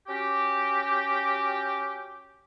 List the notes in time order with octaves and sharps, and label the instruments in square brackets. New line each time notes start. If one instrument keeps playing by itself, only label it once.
[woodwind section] C#4 F#4 G4